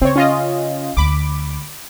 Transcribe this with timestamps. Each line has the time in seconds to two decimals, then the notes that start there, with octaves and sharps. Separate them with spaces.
0.01 C#3 C4 C#5
0.16 C#4 F4 D#5
0.97 D2 B5 D6